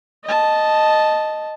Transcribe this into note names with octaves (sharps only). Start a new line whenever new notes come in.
D#5 A5